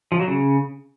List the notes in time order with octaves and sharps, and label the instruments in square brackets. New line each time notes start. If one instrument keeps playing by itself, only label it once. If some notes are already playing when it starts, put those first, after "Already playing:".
[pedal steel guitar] F3
F#3
C#3